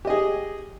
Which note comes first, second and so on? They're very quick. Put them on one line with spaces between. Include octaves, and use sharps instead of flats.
G4 D#5 G#4